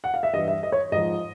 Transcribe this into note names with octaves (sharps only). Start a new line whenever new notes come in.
F#5
F5
E5
G2 E3 G3 D#5
E5
D#5
C#5
G#2 F3 D#5